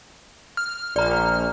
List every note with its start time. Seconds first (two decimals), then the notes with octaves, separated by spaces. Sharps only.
0.57 F6
0.96 A#1 D5 A#5 F6